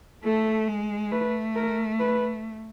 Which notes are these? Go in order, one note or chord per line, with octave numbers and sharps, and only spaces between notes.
A3 A4
G#3
A3 B4
A#4
B4